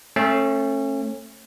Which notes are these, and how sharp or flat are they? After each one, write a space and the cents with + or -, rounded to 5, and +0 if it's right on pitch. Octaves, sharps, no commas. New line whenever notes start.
A3 +15 C#4 -35